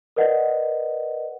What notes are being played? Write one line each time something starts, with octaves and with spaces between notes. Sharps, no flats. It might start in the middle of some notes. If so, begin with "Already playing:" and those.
A#4 B4 D5 D#5 F#5